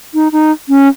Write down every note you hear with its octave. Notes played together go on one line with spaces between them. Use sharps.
D#4
D#4
C#4